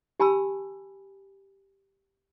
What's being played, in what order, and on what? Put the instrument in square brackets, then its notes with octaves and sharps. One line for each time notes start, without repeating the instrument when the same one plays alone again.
[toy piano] G4 G#5 A5 B5 E6